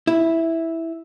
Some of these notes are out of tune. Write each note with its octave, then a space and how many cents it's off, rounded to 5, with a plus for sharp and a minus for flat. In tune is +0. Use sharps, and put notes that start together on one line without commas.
E4 -5